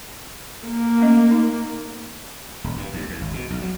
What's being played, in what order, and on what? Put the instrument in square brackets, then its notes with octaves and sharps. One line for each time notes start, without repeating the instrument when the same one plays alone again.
[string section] A#3
[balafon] A3 C#4 D#5
D#4
[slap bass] D#1
G2
D#2
E2
G#1
B2
B1
F#3